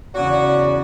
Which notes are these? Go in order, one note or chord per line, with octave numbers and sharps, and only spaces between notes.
E2 C#3 F#3 F#4 D5